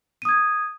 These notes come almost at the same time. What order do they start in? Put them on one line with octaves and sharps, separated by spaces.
D#7 D#6 G#6